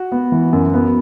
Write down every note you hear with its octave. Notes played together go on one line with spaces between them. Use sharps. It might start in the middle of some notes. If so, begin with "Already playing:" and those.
Already playing: F#4
B3
E3
F#2
B3